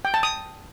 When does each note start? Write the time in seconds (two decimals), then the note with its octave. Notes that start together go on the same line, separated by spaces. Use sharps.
0.05 G5
0.14 A5
0.23 D#6